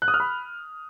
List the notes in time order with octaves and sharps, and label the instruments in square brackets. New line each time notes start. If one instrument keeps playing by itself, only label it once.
[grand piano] F#6
D#6
F6
B5